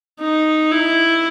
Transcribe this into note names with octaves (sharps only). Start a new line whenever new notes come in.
D#4
E4